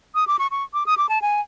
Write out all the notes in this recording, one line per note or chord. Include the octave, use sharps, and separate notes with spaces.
D#6
D6
C#6
C#6
D6
D#6
D6
A5
G#5